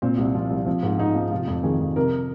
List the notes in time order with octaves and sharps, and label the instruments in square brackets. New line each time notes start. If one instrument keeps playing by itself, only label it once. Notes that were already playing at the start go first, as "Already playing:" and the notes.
[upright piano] A#2 C4
C2
F3 F4
C2
F3 C4
G#2
G#2 D#4
F3
C3 F4
F2
D#3 G#4
F2
C3 A#4